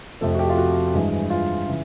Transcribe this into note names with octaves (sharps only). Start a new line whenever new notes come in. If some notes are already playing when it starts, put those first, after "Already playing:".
F2 C3 F3 A3 A4
F#4
G4
F4
F#4
G2 E3 G#3
F4
C#3 E3